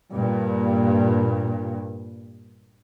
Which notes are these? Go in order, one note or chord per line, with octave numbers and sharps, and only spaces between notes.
G2 A#2